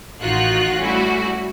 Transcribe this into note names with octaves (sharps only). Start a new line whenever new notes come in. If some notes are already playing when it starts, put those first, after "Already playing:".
A1 D#3 D#4 F4 F#4 F#6
G3 A3 C#4 E4 F#4